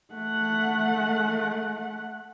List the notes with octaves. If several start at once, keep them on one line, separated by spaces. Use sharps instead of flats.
A3 F#5